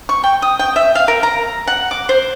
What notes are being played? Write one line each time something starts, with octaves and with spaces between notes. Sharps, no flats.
C#6
G5
D#6
G5
E5
F5
A#4
A#5
F#5
D6
C5